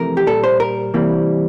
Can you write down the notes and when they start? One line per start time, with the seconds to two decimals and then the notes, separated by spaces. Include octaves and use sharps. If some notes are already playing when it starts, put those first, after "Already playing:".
Already playing: F2 C3 E3 A3 A#4
0.17 G4
0.27 A#2 G3 A#3 A4
0.44 C5
0.60 A#4
0.94 C3 E3 G3 A#3